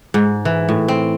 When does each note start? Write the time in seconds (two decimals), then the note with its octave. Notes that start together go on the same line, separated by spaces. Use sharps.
0.14 G#2
0.45 E3
0.69 A2
0.88 C4